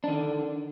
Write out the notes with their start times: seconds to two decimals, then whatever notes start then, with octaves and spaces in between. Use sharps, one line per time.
0.04 D4
0.08 D#3
0.12 D3